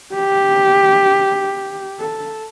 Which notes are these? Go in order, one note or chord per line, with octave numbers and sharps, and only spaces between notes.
G4
A4